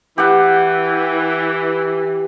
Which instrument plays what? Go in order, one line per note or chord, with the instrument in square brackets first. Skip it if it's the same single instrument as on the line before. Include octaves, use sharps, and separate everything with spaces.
[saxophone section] E3 [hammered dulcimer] G4 F#5